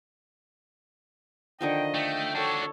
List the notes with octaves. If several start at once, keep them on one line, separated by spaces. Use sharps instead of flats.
D3 D#3 F3 D#5 G5
A3 G5
D4 F#4 A4 C#5